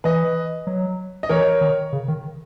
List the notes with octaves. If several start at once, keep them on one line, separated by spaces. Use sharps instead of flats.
E3 B4 D#5
F#3
D#5
E3 A#4 C#5
D#3
C#3
D#3